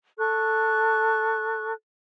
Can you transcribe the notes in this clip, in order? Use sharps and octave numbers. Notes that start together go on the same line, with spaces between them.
A4 C#6 F#6